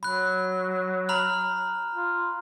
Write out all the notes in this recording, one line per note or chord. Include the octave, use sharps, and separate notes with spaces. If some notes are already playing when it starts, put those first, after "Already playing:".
F#3 B5 F#6
A#5 B5 F6
F4